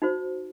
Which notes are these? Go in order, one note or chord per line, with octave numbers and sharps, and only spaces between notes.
D#4 F#4 C5